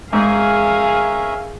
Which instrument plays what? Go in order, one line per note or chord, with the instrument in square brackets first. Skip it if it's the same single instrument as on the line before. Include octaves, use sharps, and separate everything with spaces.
[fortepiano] G#2 [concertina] C#4 A#4 E5 [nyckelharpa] G#4 [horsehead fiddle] F5 G#5